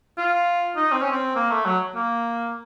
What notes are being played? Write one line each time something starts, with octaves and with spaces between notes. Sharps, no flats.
F4
D#4
C4
C#4
C4
A#3
A3
F#3
A#3